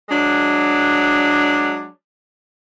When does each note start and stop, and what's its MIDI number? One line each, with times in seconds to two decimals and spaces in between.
0.09 1.87 54
0.09 1.87 56
0.09 1.87 62